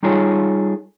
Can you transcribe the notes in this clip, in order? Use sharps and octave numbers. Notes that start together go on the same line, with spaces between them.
G3 D#4 F4 G#4 A4 C#5